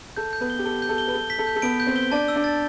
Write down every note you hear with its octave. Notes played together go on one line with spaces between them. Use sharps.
A4 G6
G6
B3 B4
G7
G4
A4 G7
G6
A4
G7
B4
A4 G7
B6
A4
G6
A4
B3 B4 D7
G6
C4 C5
G7
D4 D5 A5
E6
D4 D5
A6